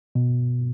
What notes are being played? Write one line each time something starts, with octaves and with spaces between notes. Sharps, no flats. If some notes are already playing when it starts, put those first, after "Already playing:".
B2